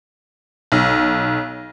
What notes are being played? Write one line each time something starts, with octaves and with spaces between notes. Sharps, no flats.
B1